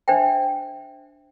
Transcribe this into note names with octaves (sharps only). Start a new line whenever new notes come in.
D4 C5 E5 G5